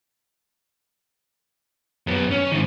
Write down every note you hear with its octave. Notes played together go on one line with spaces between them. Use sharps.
F#2 B3
C#4
G#2 D#3